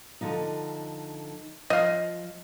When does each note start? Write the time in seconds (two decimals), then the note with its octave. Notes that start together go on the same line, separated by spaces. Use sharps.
0.21 D3 F3 D#4
1.70 F3 D#5 F5